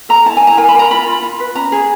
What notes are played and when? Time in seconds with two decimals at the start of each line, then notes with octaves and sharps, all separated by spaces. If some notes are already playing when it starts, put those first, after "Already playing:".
0.09 A4 A#5
0.26 E4 A5
0.37 E4 G#5
0.47 A#5
0.57 A#4 G#5
0.69 B5
0.75 A#4 A#5
0.91 F4 B5
1.07 F4
1.22 F4
1.40 B4
1.55 C#4 A#5
1.72 G#4